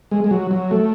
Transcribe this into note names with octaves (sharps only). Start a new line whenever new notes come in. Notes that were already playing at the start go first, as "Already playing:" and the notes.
G#3
G#3
F#3
F#3
A3